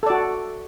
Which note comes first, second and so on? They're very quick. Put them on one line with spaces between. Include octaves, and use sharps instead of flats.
A4 D5 F#4